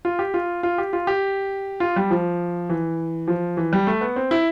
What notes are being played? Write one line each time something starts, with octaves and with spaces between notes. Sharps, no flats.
F4
G4
F4
F4
G4
F4
G4
F4
G3
F3
E3
F3
E3
G3
A3
B3
C4
E4